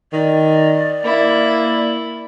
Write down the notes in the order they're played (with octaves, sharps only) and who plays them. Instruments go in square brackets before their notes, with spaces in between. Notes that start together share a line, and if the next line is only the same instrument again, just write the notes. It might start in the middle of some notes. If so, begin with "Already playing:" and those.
[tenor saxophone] D#3 [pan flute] D5
[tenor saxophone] A#3 [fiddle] E4